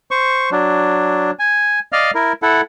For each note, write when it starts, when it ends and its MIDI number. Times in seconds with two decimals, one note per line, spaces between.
0.11 0.50 72
0.11 0.50 85
0.52 1.31 54
0.52 1.31 62
1.39 1.80 80
1.92 2.11 74
1.92 2.11 75
1.92 2.11 77
1.92 2.11 89
2.15 2.33 64
2.15 2.33 70
2.42 2.61 64
2.42 2.61 69
2.42 2.61 78